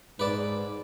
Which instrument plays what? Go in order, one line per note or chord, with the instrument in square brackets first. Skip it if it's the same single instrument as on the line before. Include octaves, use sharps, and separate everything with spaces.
[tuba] G#2 [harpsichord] B4 D5 A5